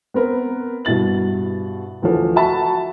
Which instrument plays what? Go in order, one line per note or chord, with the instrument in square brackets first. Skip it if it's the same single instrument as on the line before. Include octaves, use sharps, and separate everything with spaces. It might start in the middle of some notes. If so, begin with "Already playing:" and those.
[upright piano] B3 C4 A#4 B4
G2 B2 E4 A6 F#7
D2 E3 F3 A4
F#4 E5 A5 B5 C#6